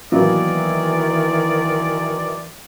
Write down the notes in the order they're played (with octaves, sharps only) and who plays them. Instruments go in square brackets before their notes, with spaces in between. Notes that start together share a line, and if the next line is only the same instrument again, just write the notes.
[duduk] D#3 [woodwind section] E3 [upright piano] F#3 A#3 B3 [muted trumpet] D5